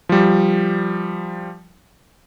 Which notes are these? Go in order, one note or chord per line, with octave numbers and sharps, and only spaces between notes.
F3 G3